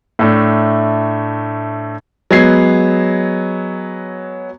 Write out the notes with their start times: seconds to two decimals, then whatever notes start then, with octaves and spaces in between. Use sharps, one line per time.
0.19 A2 A3 D4
2.31 F#3 G#3 B3 G#6 C7